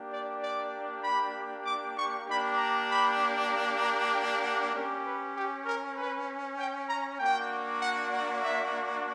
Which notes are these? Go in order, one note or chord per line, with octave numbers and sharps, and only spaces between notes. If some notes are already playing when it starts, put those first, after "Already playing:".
Already playing: A#3 D4 G4
D5
D5
B5
D6
C#6
A#3 D4 G4 B5
A#5
B5
A#5
A#5
G5
F#5
C#4 G4 A#4
B4
G4
A#4
B4
G5
A#5
A#3 D4 F#4 G5
F#5
F#5
E5